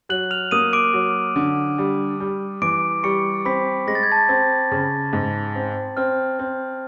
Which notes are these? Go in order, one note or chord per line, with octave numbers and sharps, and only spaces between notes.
F#3 F#6 F#7
F6 F7
A#3 D#6 D#7
D6 D7
F#3
D3
G3
G3
E3 D6 D7
G3 C#6 C#7
C4 B5 B6
G#3 A#6
A6
G#6
A5 A6
C4
C#3
G#2
C4
C4 F6
C4